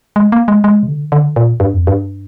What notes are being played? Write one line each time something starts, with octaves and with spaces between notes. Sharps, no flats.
G#3
A#3
G#3
G#3
C3
D3
D3
A#2
G2
F2
G2